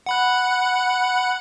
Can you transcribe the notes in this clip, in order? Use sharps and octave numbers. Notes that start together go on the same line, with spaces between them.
F#5 B5 F#6